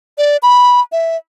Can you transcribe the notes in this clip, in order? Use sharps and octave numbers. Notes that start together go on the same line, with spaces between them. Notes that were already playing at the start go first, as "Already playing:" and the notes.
D5
B5
E5